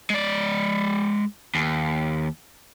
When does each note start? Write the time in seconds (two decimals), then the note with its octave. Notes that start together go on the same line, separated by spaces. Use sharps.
0.10 G#3 D5
1.55 D#2